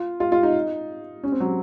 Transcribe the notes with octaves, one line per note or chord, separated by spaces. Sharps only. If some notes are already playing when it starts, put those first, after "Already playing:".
Already playing: F4
F4
F4
D#4
C#4
C4
F#3